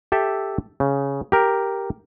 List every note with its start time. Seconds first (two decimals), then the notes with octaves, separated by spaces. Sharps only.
0.12 G4 A4 E5
0.80 C#3
1.32 G4 A#4